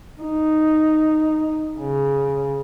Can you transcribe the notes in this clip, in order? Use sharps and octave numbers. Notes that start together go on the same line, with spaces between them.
D#4
C#3